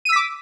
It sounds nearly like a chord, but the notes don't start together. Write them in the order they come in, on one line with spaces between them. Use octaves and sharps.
D#7 E6 B6 D6